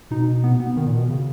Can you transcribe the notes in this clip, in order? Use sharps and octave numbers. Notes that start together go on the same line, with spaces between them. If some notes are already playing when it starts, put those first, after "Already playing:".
B2 D#4
B3
B3
D#3
A#2
B2
C#3